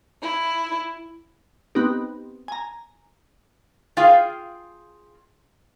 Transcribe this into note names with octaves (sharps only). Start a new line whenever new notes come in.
E4
B3 C4 D#4 G4
G#5 A#5
F4 G#4 F5 G5